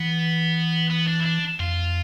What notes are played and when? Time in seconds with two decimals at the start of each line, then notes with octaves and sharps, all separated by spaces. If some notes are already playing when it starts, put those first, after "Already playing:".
Already playing: E3 B3
0.90 B3
1.07 D4
1.20 E4
1.24 D4
1.59 F2 F4